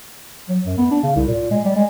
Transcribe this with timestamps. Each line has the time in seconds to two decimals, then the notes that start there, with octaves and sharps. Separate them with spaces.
0.49 F#3
0.66 F#2
0.78 B3
0.91 D4
1.03 C#3
1.16 C2
1.28 A#2
1.51 G#3
1.65 G3
1.76 G#3